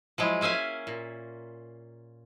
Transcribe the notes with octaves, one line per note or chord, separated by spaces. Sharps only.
F3 F#3 G#3 E4
A#3 C#4 E5 F5 G#5
A#2